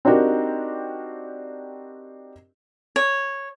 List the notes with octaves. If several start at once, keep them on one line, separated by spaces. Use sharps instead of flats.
C4 D4 D#4 F#4 G4 A#4
C#5